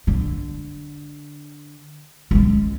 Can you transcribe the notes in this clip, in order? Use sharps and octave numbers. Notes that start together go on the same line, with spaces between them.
D3
C#2 G#3